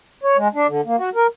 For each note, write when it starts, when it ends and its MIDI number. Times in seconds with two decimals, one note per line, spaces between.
0.24 0.37 73
0.37 0.48 56
0.55 0.67 62
0.68 0.81 50
0.86 0.96 58
0.98 1.10 66
1.15 1.27 70